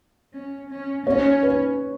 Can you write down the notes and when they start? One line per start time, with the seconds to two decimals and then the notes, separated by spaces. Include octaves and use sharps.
0.33 C#4
0.70 C#4
1.06 C#4 C#5
1.43 B4